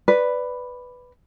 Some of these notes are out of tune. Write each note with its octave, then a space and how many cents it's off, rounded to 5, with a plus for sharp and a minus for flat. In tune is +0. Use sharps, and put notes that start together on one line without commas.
B4 +5 D5 +0